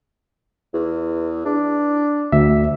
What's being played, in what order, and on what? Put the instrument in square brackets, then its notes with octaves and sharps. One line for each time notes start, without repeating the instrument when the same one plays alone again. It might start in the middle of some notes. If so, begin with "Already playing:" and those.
[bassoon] E2
D4
[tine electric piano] D2 E5